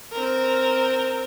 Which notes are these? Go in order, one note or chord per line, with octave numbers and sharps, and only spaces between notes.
C4 A#4